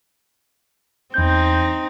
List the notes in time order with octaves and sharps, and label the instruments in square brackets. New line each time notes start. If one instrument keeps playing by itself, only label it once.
[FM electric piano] E2 G6 [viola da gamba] C4 D#4